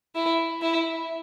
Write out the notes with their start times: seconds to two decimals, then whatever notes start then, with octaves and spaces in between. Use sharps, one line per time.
0.15 E4
0.62 E4